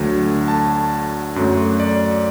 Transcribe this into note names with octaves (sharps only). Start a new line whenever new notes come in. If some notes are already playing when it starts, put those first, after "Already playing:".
Already playing: D2 D3 F#3 A3
A5
F#2 F#3 A3
D5